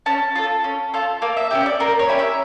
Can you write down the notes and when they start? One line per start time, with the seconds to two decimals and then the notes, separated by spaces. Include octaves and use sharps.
0.06 C#4 A5
0.35 F4 A4
0.64 C#4
0.94 F4 A4
1.22 A#3 F5
1.37 E5
1.51 C#4 E4 G4 E5
1.66 D5
1.80 A#3 A#4
1.99 C#5
2.09 C#4 E4 G4
2.19 E5